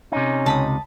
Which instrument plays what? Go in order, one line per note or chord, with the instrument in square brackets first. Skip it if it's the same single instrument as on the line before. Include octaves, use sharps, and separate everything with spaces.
[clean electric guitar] C3 D#4 [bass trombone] C#4
[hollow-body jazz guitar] C#2 [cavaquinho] A5 B5 D#6